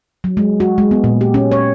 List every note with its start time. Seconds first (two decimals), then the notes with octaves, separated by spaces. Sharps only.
0.24 F#3
0.37 G#3
0.60 F#4
0.78 G#3
0.91 B3
1.04 A#2
1.21 G4
1.34 C#4
1.52 C#5